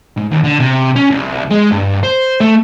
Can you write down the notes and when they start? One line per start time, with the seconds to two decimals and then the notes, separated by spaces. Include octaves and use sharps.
0.17 G#2
0.31 D#2
0.44 D3
0.60 C3
0.96 C#4
1.11 C2
1.51 G#3
1.72 G2
2.03 C5
2.40 A3